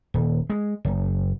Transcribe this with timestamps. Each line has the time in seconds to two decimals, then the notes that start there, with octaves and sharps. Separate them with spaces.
0.14 D#1
0.50 G#3
0.85 F#1